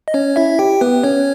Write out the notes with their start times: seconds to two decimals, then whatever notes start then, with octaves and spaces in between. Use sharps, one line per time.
0.08 D#5
0.14 C#4 C#5
0.36 E4 E5
0.59 G4 G5
0.81 B3 B4
1.03 C#4 C#5